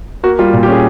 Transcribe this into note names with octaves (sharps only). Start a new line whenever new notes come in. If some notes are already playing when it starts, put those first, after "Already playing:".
A#3 F#4
G3 F4
A#2
G4
C#4 G#4